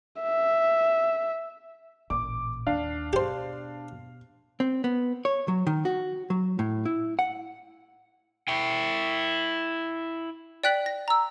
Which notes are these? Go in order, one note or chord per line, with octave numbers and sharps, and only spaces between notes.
E5
A1 A#2 D6
D#2 D4 F5
B2 G4 C5
C4
B3
C#5
F#3
D#3
F#4
F#3
A2
E4
F#5
E4 G5
D5 G5 F#6 B6 F#7
A#6
A#5 E6